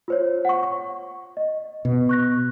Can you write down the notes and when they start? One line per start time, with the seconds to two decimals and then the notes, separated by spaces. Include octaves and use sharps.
0.08 F4 C5 C#5
0.45 F#5 C#6
0.63 C#6
1.37 D#5
1.85 B2
2.09 C#6 F#6 A#6